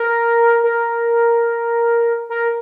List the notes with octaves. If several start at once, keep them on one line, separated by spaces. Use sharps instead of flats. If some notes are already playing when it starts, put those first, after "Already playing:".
Already playing: A#4
A#4
A#4